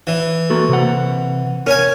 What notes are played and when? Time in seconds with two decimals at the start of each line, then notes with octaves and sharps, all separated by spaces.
0.07 E3
0.50 A#3 F#4 A4
0.69 C3 F#5
1.67 C#4 A#4 G#5